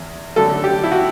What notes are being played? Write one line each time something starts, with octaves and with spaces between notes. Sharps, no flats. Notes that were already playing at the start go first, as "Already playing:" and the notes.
Already playing: E2
F#2 D3 A3 A4
G4
E4
F#4